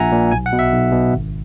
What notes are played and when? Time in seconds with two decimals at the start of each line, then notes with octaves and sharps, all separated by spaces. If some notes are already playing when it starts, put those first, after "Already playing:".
Already playing: A#1 A#2 E5 F#5 G#5 A#5
0.12 A#2
0.31 B1 G#5
0.46 F#5
0.52 B2
0.59 E5
0.73 B1
0.92 B2
1.13 G#1